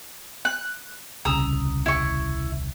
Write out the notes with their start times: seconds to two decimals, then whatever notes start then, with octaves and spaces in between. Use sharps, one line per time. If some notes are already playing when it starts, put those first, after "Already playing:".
0.45 F#6
1.25 D#1 C2 C#3 A#5 D#6 E6
1.86 E4 C#6